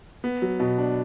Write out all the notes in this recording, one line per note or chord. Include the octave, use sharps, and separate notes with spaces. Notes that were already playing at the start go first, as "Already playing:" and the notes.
B3
F#3
B2
D4